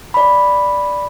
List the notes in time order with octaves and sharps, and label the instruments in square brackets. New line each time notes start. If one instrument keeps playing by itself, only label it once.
[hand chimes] D5 B5